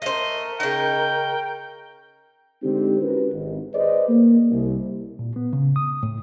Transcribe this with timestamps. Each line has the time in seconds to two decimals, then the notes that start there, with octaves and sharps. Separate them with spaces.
0.02 A3 A#4 C5 D#5
0.60 C#3 D#4 G5
2.63 D3 G#3 C4 D#4 G4
3.01 C#4 E4 F#4 G4 A#4 B4
3.32 G#1
3.74 G#4 B4 C5 D5 D#5
4.09 A#3
4.51 C2
5.19 A#2
5.36 B3
5.53 C#3
5.76 D#6
6.03 A2